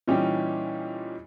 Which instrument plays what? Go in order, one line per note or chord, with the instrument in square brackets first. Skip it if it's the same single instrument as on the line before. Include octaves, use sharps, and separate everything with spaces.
[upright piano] A#2 E3 G3 C#4 D#4 G4